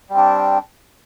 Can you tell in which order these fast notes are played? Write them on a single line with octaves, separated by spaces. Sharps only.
G3 C4 D4